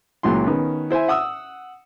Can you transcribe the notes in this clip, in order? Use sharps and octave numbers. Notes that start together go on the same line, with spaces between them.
C#2 A#2 F#3 E4 C6
D#3 B3 C#4
E4 C5 E5 G#5
F#5 D#6 E6